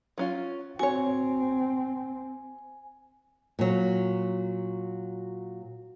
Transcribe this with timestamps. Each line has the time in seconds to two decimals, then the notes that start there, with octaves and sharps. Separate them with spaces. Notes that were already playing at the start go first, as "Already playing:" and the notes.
0.18 F#3 C#4 F4
0.79 C4 F#4 C#5 G#5
3.59 A#2 F#3